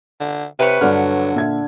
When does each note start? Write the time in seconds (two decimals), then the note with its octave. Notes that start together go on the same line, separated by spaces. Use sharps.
0.21 D3
0.59 C3 B4 C#5
0.81 G2 D3 F#3 D5 F6
1.35 A#2 E5 G#6